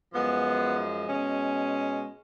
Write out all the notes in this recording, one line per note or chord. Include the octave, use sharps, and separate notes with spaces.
F#2 F3 G#3 B3
B2 G#3 C#4